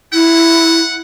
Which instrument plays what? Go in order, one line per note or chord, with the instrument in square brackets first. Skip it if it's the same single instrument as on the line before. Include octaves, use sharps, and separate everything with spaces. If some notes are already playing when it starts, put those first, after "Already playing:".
[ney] E4 [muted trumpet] F#5